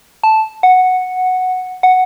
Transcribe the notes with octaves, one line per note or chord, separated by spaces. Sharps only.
A5
F#5
F#5